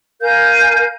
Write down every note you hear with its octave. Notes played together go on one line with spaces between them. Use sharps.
A#4 F5 G#5 G6